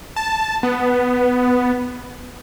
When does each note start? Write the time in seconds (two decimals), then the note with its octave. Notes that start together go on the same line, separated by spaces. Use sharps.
0.16 A5
0.63 B3